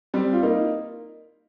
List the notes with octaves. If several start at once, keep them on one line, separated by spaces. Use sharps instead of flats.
G3 C4
F4
A#3 D#4